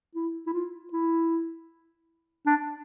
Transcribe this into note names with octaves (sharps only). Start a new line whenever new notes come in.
E4
E4
F4
E4
D4